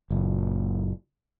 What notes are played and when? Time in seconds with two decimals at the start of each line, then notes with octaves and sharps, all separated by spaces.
0.11 F#1 A#2